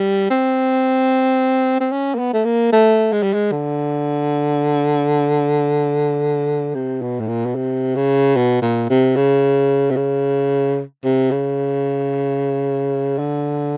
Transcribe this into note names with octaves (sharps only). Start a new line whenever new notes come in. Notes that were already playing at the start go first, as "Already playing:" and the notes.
Already playing: G3
C4
C4
C#4
A#3
B3
A3
A#3
A3
G#3
G3
G#3
D3
C3
B2
A2
A#2
B2
C3
C#3
B2
A#2
C3
C#3
C3
C#3
C3
C#3
D3